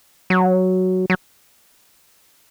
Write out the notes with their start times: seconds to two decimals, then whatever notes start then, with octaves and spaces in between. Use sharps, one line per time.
0.30 F#3
1.10 F#3